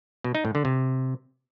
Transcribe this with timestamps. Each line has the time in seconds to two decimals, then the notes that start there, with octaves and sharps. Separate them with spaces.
0.24 B2
0.35 D#4
0.45 A2
0.55 D3
0.65 C3